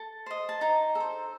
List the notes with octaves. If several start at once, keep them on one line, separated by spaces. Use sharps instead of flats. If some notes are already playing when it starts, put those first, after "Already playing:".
Already playing: A4
C5 D#5
A5
D#4 A#5
A4
C5